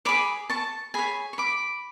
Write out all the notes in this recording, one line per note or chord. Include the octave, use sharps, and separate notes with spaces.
G#4 C#5 B5 D6
A5 C#6
G#4 C#5 G#5 B5
C#6
B5 D6